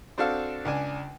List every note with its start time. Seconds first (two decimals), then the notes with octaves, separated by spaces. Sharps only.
0.18 C4 D4 F#4 A4 F5
0.65 C#2 D4 G#5